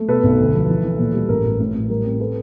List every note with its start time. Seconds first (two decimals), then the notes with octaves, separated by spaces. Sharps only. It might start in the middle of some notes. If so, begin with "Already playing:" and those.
Already playing: A3
0.08 B2 A4 B4
0.23 B1
0.39 D2
0.55 F3
0.69 E3
0.84 E3
0.99 A#2
1.14 G3
1.29 A1 A#4
1.45 A1
1.59 A2
1.74 A2
1.89 G3 A#4
2.04 C4
2.20 A4 B4